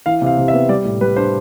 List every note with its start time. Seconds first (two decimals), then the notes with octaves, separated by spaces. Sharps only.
0.06 E3 F5
0.22 C3
0.27 F5
0.38 C3
0.48 E5
0.53 B3
0.69 G3 D5
0.85 A2
1.01 G3 B4
1.16 D4 C5